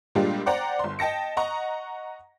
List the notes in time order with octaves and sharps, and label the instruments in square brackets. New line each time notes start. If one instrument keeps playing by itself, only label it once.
[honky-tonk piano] A#2 G3 G#3 D4 F4 G4
C5 D5 F#5 G5 A#5
G1 C6
D#5 G5 A5 A#6 C#7
D#5 F#5 A#5 C#6